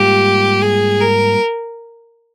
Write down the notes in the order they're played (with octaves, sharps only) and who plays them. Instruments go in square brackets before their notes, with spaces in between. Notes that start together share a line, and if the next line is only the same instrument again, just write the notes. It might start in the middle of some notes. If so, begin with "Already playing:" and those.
Already playing: [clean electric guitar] G#2 G3 A#3 F4 [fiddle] G4
[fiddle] G#4
A#4